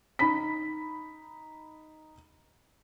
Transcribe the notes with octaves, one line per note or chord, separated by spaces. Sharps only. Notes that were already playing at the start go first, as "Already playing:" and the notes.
D#4 B5 B6